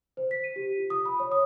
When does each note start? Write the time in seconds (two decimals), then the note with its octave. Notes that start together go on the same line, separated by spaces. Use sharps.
0.17 C5
0.31 B6
0.44 D#7
0.56 G4
0.78 F4
0.90 D#6
1.06 B5
1.20 C#5
1.32 D#6